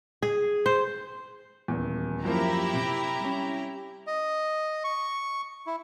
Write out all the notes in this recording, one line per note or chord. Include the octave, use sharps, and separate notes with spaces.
G#4
C5
D#1 E2
F#2 F3 A#3 E4 G4 A#5
C3
G3 C#4
D#5
C#6
E4